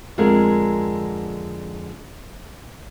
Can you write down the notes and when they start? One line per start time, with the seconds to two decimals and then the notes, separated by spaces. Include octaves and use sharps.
0.18 F2 D3 G#3 A#4